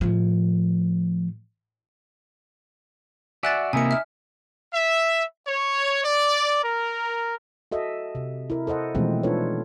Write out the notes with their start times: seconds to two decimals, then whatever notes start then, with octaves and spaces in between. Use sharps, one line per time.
0.01 A2 F3
3.43 F#4 D5 E5 G#5 F#6 A6
3.73 C3 A#3 D#4 E4 G#5 C#7
3.91 E5 F6
4.73 E5
5.48 C#5
6.04 D5
6.64 A#4
7.72 F#4 A4 D#5 E5
8.15 C3
8.50 E4 A#4
8.67 A4 C5 D#5 F#5
8.95 B2 E3 F3 G#3 A3 C4
9.23 D4 D#4 F4 A4 B4 C#5